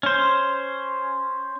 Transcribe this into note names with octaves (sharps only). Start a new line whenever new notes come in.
C#4 C5